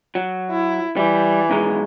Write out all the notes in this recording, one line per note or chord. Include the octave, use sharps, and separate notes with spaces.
F#3
E4
E3 G3
B1 D#3 G#3